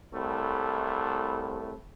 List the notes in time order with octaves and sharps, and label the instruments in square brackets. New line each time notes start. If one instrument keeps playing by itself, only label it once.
[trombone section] C2 A2 A3